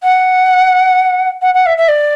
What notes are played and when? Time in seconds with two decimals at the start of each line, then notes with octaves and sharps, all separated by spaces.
0.03 F#5
1.42 F#5
1.55 F#5
1.66 E5
1.78 E5
1.88 D5